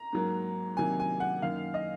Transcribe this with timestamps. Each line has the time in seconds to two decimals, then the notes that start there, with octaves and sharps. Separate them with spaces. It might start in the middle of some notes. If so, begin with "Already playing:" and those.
Already playing: A#5
0.13 G#2 F#3 A#3
0.77 C3 D#3 F#3 A#3 G#5
0.99 G#5
1.20 F#5
1.42 F#2 D#3 A#3 F5
1.74 D#5